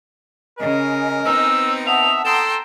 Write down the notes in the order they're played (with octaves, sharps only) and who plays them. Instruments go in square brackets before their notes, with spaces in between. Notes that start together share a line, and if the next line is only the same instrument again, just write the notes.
[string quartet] C#3 [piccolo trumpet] A#4 [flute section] D#5 G#5
[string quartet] B3 C4 D#4 [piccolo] E6
[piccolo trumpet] E5 [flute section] F#5 A5 D#6 [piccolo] F7
[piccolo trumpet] A4 [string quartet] G5 A#5 C6 [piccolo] E7